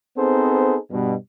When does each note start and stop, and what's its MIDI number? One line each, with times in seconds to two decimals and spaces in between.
0.17 0.77 59
0.17 0.77 60
0.17 0.77 63
0.17 0.77 68
0.17 0.77 69
0.17 0.77 72
0.91 1.14 43
0.91 1.14 47